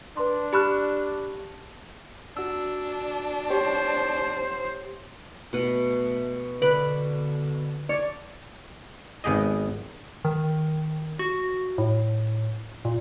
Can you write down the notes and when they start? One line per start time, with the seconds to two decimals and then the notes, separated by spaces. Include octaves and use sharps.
0.17 D4 B4 C6
0.53 G4 A5 B5 C#6 F6 F#6
2.37 D4 F#4 E6
3.50 G4 C5 C#5
5.53 B2 A3 B4
6.62 D3 B4 D5 B5
7.89 C#5 D5
9.24 G#1 B3 G4 G#4 D#5
10.25 D#3
11.19 F#4
11.78 A2
12.85 A#2